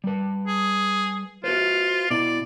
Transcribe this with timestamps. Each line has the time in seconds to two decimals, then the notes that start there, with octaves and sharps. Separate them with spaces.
0.04 G3 B4
0.47 G#4
1.44 F4 F#4 B4 C5
2.11 B2 E4 D5